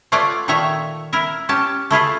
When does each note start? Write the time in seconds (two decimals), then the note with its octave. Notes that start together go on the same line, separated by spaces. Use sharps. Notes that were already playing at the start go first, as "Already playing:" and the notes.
0.12 A3 F4 C#5 D5 F#5 G#5
0.48 A#2 D#3 A3 C#5 E5 A#5
1.13 E4 A#4 E5
1.49 C#4 G4 A5
1.90 A3 E4 F4 G#4